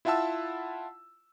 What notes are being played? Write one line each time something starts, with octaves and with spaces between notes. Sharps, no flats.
E4 F4 E5 F#5 A5 E6